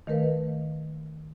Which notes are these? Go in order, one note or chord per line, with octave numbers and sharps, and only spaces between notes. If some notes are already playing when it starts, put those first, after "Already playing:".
D#3 A3 A#4 B4 F5